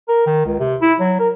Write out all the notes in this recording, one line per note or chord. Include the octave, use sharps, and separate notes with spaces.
A#4
D#3
C#2
C3
E4
F#3
A#4